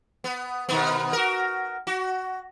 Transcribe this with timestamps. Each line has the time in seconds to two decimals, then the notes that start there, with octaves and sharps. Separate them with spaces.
0.24 B3
0.69 B2 D#3 B3
1.13 F#4 A#4
1.87 F#4